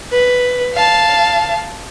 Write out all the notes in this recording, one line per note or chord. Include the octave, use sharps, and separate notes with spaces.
B4
F5 A5